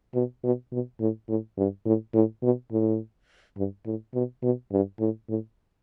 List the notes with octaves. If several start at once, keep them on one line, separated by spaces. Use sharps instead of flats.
B2
B2
B2
A2
A2
G2
A2
A2
B2
A2
G2
A2
B2
B2
G2
A2
A2